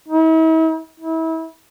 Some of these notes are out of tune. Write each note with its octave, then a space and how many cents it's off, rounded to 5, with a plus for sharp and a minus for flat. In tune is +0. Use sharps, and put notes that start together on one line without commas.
E4 -45
E4 -30